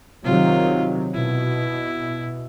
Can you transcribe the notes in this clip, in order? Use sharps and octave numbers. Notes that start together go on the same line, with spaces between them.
C3 D#3 F#3 F4
B2 E4